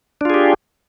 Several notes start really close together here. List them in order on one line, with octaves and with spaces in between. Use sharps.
D4 F4 G#4 G4